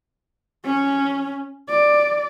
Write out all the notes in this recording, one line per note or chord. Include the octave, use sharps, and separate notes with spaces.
C#4
D5